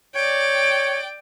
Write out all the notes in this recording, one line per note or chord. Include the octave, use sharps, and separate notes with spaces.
C#5 D5 G5